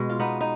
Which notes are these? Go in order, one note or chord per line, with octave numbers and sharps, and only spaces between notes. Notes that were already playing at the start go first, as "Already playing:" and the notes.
Already playing: B2 G#3
F4
B3 D#4
D#4